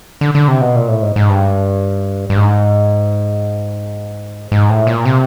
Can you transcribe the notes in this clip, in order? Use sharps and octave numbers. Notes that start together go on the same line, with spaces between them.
D3
D3
C3
B2
A#2
A2
G#2
G#2
G2
G2
G#2
G#2
A2
A#2
C3